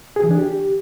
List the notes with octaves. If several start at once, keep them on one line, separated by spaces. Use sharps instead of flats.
G#4
E3
D4
G4